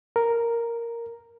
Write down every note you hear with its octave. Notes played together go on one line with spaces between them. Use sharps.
A#4